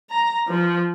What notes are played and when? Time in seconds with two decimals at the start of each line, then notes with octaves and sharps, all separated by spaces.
0.10 A#5
0.48 F3